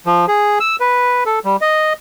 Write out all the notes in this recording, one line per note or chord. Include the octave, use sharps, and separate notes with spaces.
F3
G#4
E6
B4
A4
G3
D#5